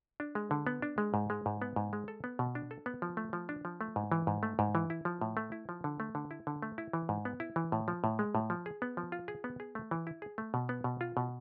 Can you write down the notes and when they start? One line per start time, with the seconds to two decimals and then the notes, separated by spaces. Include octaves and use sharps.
0.20 D4
0.35 G#3
0.51 D3
0.67 B3
0.82 D4
0.98 G#3
1.14 G#2
1.30 G#3
1.46 G#2
1.62 B3
1.76 G#2
1.93 G#3
2.08 A4
2.24 B3
2.39 B2
2.55 D4
2.71 A4
2.86 B3
3.02 F3
3.17 A3
3.33 F3
3.49 D4
3.65 F3
3.81 A3
3.96 G#2
4.12 E3
4.27 G#2
4.43 A3
4.59 G#2
4.75 E3
4.90 E4
5.05 F3
5.21 A2
5.37 A3
5.52 E4
5.69 F3
5.84 D3
6.00 A3
6.15 D3
6.31 E4
6.47 D3
6.62 A3
6.78 E4
6.93 E3
7.09 G#2
7.25 B3
7.40 E4
7.56 E3
7.72 A2
7.88 F3
8.04 A2
8.19 G#3
8.35 A2
8.50 F3
8.66 G#4
8.82 B3
8.97 F3
9.12 F4
9.28 G#4
9.44 B3
9.60 G#4
9.75 A3
9.91 E3
10.07 E4
10.22 G#4
10.38 A3
10.54 B2
10.69 B3
10.84 B2
11.01 F4
11.17 B2